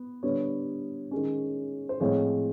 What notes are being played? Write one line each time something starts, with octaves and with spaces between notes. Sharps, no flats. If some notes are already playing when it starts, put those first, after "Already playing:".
Already playing: B3
D3 G3 B3 C#5
D#3 G#3 C#4
C5
A2 F3 G#3 C4 C#5